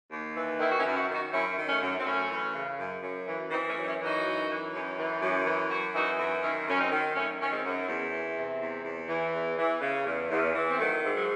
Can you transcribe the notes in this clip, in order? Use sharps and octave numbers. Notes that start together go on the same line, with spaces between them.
D#2
E3
D#3 E4
F#4
C#4 E4
F#2
F#4
D#3
D#4 F#4
F#2 C#4 E4
D#3
A3 C#4
F#2
C4
F#2 A3 C#4
E3
C#3
F#2
F#2
E3
E3 C4 D#4
A3 C#4
F#2
D#4
C#4 E4
E3
D#4 F#4
F#2
E3
F#2
E3
F#2
E3
F#2 F#4
E3 D#4 F#4
F#2
D#3 C#4 E4
F#2 C#4
C4 D#4
D#3
F#2 A3 C#4
D#3 C#4
G#3 C4
F#2
E2
E3
C3
E2
E2
E3
E2
E3
C#3
E2
E2
E3
C4
D#3 F#3 A3
G#2
F#3